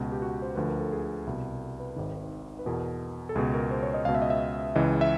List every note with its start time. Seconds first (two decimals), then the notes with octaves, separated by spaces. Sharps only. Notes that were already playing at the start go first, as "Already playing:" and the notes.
Already playing: C#2 B2 F#4
0.12 G4
0.22 F#4
0.42 C5
0.55 D2 D3 F3 B4
0.68 A#4
0.80 A4
0.92 G#4
1.27 C2 B2
1.80 B4
1.96 G#1 G#2 D#3
2.59 B4
2.66 E2 B2 A#4
3.29 A4
3.35 C#2 B2 G#4
3.54 A#4
3.71 C5
3.83 C#5
3.94 D#5
4.05 C#2 B2 F5
4.15 E5
4.22 D#5
4.30 E5
4.75 C#2 C#3 E3 D#5
5.01 E5